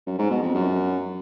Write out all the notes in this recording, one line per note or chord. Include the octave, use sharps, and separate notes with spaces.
F#2
G#2
B2
F2
F#2